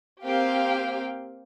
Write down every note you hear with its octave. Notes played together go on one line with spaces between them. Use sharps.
A#3 C4 G4 F5 G5